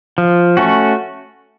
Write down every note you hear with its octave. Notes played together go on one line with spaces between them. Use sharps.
F3
A3 C#4 F#4